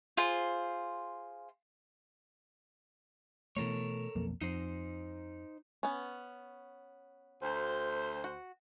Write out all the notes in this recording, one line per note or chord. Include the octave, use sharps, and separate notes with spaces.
F4 G#4 C5
B2 E3 A3 A4 A#4 C#5
B1 F2 A#3
F2 D#4 C5
B3 C#4
D2 C5
F#4